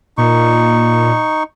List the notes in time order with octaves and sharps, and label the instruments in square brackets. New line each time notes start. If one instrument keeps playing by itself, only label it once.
[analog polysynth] A#2 [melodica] D#4 C#6